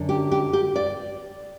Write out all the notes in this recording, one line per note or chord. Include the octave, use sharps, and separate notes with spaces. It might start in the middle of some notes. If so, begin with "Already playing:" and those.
Already playing: F#2 D3
G4
G4
G4
D5